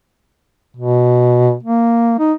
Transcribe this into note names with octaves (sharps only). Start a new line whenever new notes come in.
B2
A#3
D#4